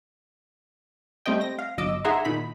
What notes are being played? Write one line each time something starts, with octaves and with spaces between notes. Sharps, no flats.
G3 A3 C4 G4 D#5 G5
A#6
F5
G1 F#3 D#5 D6 E6
D#4 G#4 E5 F#5 A#5 C6
A#2 D#3 B5 B6